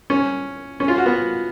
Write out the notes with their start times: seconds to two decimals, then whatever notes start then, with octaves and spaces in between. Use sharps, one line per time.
0.10 C#4
0.80 C#4
0.88 F4
0.98 F#4
1.06 B3